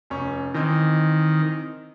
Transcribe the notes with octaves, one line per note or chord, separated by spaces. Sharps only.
F1 C#4 C#6
D#3 E3 C4 D#5